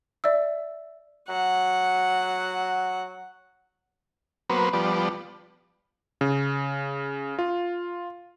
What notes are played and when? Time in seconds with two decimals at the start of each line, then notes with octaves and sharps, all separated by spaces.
0.24 D5 E5 E6
1.29 F#3 F#5
4.50 F#3 A#3 B3 B4 C5
4.73 F3 G3 B3 D5
6.21 C#3
7.39 F4